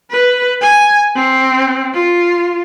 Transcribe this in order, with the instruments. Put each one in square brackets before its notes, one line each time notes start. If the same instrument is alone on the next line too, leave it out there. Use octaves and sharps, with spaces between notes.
[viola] B4
G#5
C4
F4